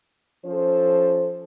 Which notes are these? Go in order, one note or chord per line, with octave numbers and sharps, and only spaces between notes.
F3 C#4 A4 C5